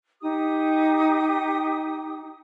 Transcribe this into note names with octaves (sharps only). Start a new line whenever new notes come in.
D#4 G4 D#6